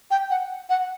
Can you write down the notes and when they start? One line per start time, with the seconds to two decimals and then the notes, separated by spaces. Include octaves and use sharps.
0.11 G5
0.30 F#5
0.70 F#5